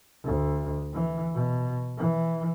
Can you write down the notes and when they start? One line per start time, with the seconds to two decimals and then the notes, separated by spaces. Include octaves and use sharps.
0.24 D2
0.93 E3
1.34 B2
1.98 E3